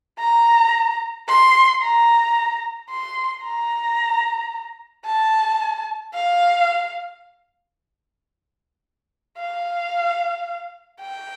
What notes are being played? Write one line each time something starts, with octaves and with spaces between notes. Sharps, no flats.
A#5
C6
A#5
C6
A#5
A5
F5
F5
G5